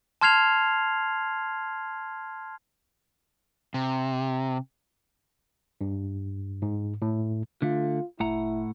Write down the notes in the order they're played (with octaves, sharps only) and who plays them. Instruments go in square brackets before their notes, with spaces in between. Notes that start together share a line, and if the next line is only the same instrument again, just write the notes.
[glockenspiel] A5 C6 F6 G#6 C7 F7
[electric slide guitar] C3
[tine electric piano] G2
G#2
A2
[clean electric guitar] D3 A3 [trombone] F4
[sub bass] F1 [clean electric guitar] A2 F#5 A#5 [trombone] E4